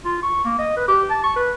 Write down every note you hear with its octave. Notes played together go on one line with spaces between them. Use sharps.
F4
C#6
A#3
D#5
B4
G4
A5
C#6
B4